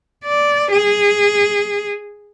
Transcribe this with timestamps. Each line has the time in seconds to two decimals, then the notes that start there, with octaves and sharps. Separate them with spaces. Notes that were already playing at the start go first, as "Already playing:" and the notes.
0.24 D5
0.71 G#4